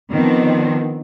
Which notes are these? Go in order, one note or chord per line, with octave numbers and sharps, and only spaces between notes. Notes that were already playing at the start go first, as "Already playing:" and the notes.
D#3 F3 B3 C4 D4